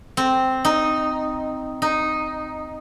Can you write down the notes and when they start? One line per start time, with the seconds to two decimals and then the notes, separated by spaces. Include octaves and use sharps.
0.17 C4
0.65 D#4
1.82 D#4